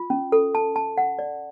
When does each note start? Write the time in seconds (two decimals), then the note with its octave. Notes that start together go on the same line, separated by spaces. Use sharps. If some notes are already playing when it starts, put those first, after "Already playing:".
Already playing: F4
0.10 C#4
0.32 A4
0.55 A5
0.76 A5
0.98 F#5
1.19 D5